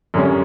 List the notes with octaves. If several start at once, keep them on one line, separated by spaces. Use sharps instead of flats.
F#2 D3 G3 C#4